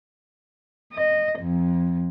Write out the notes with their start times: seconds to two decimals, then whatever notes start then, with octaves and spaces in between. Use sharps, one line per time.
0.92 D#5
1.39 F2